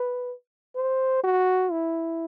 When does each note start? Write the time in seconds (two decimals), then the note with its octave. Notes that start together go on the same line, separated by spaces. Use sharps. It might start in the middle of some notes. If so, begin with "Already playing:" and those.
Already playing: B4
0.76 C5
1.24 F#4
1.71 E4